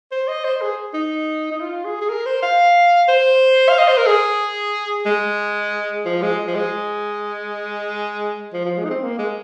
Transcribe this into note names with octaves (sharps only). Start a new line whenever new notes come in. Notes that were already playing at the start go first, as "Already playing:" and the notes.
C5
D#5
C5
G#4
D#4
D#4
F4
G#4
G#4
A#4
C5
F5
C5
F5
D#5
C5
A#4
G#4
G#3
F3
G#3
F3
G#3
F3
F3
G#3
D#4
C4
A#3
G#3